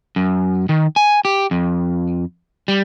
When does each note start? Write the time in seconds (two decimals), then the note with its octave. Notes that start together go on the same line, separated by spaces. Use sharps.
0.16 F#2
0.69 D#3
0.96 G#5
1.25 G4
1.51 F2
2.68 G3